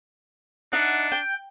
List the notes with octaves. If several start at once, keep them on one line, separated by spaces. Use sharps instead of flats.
D4 D#4 E5 F#5
G5